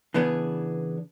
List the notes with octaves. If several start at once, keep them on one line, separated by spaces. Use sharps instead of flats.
C#3 E3 B3 D4 G#4